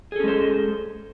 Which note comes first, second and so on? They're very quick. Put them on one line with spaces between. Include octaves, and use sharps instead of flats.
G#4 A4 C#4 G#3 C5